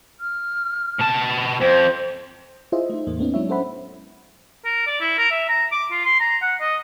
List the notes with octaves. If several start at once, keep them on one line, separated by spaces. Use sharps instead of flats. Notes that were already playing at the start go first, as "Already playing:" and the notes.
F6
B2 A5
F2 C5
E4 F4 G#4 C5 D#5 E5
A3 D#4
E2 A2 A#3
A3 B3 C#4 D#4
F#3 G#3 D4 E4 C#5 E5
C#4 A4 C5 E5 F#5 B5
A#4
D5
E4
A#4
E5
A#5
D6
F4
C6
A#5
F#5
D#5